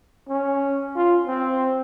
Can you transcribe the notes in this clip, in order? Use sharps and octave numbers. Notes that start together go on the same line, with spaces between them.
C#4
F4
C4